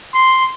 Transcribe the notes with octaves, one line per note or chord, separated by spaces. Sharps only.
C6